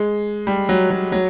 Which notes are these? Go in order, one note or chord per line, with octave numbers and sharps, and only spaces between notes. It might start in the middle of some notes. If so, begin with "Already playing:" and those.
Already playing: G#3
G3
F#3
F#3
F#3